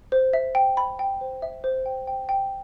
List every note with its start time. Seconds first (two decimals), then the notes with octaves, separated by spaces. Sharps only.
0.12 C5
0.33 E5
0.55 G5
0.77 B5
0.99 G5
1.21 C5
1.42 E5
1.64 C5
1.86 G5
2.07 G5
2.29 G5